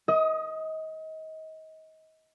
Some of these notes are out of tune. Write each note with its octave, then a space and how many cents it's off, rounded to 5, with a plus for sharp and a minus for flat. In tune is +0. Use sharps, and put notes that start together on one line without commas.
D#5 +30 D#6 +0